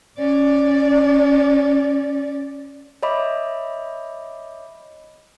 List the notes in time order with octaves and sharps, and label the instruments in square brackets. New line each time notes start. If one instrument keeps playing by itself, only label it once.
[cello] C#4 D5
[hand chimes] C#5 D#5 E5 B5 D6